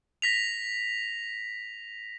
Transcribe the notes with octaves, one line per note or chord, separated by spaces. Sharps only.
A#6 B6 F7